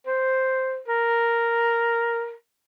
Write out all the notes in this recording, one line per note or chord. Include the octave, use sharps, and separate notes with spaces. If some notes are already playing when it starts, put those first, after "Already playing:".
C5
A#4